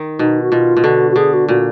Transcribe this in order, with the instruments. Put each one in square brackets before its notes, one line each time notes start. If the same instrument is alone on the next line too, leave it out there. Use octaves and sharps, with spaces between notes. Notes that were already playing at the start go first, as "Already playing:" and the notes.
Already playing: [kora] D#3
[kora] B2 [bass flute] D#4
[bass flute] F#4
[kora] B2 [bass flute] F4
[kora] B2
[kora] D3 [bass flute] F#4
[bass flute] F#4
[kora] D3 [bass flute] G#4
[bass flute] F#4
[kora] A#2 [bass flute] F#4